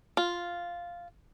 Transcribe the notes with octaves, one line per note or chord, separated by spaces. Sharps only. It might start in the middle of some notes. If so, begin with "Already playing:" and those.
F4